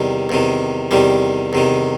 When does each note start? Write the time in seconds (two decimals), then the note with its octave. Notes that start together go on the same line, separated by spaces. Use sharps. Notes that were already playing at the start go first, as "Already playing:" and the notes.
Already playing: E2 C3 D#3 G3
0.29 E2 C3 D#3
0.91 E2 C3 D#3 G3
1.53 E2 C3 D#3